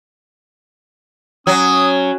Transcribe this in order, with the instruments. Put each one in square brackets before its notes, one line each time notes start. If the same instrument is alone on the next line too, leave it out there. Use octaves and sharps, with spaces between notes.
[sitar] F#3 [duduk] C#4 [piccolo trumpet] D#6